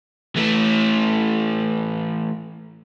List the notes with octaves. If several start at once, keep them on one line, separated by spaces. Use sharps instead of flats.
E3 A3